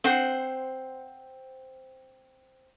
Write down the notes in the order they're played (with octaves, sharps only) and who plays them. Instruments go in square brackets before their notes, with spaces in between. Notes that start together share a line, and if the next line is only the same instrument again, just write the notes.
[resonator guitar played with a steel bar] C4 C5 F#5